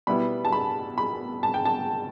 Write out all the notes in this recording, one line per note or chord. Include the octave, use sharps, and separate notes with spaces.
B2 G3 B3 E4 B5
A5
B5
B5
A5
G5
A5